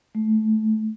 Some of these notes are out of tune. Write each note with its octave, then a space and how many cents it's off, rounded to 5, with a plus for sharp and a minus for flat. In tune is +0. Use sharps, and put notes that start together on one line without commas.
A3 -15